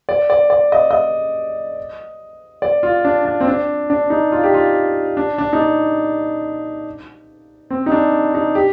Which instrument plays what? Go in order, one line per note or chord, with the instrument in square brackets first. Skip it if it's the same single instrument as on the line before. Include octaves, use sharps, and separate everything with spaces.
[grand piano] D5
D5
D5
D#5
D#5
D5
F4
D4
D4
C4
D4
D4
D#4
F4
G4
F4
D4
D4
D#4
D4
C4
D#4
D4
D#4
G4